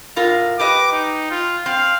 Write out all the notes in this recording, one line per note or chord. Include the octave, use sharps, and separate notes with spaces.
A2 F4 A#4
G4 B4 D#5 D6
D#4
F4
C4 F5